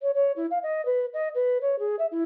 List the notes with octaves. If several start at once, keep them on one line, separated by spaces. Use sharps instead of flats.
C#5
C#5
E4
F5
D#5
B4
D#5
B4
C#5
G#4
E5
E4